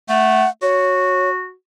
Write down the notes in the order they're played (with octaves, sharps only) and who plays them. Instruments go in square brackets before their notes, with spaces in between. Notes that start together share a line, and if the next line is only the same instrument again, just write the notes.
[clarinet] A3 [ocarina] F#5
[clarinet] F#4 [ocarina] C#5